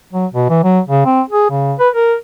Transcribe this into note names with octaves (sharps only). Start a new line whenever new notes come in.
F#3
B2
E3
F#3
C#3
C4
G#4
C#3
B4
A#4